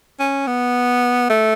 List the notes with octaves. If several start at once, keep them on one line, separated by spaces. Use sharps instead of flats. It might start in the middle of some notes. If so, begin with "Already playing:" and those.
C#4
B3
A3